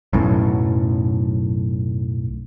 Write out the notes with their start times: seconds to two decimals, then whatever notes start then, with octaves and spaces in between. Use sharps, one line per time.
0.13 B1 F#2 A2